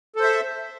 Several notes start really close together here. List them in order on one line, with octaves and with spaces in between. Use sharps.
A4 C5 E5